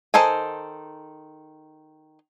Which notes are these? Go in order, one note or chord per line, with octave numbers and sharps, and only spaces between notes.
D#3 D#4 A4 C5 G#5